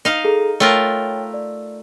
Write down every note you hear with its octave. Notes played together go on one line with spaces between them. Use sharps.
D#4 F5
G#4 A4 A#5
A3 F4 A#4 C#5 G5
D5